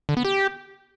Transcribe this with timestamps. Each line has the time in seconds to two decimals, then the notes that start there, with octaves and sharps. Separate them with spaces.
0.09 D3
0.17 B3
0.25 G4